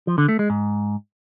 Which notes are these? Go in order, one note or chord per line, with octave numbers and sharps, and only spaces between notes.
F3
D3
A3
G#3
G#2